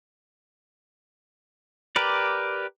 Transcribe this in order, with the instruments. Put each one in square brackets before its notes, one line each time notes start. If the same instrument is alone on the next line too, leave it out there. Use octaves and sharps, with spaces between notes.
[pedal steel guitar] G4 A#4 B4 D5